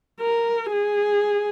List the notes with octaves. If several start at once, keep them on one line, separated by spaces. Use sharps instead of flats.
A#4
G#4